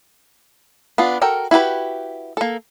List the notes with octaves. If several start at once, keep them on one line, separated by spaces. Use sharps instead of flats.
B3 D4 F4
F#4 A4 A#4 G5
E4 F#4 G4 B4
A#3 A4